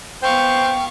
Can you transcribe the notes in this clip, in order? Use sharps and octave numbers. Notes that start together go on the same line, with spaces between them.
B3 C5 F5 G5 C#6